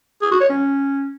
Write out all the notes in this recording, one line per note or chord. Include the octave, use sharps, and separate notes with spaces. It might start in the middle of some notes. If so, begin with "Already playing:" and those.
G#4
F#4
C#5
C#4